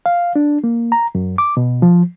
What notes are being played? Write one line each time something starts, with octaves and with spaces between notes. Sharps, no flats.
F5
D4
A#3
A#5
F#2
D6
B2
F3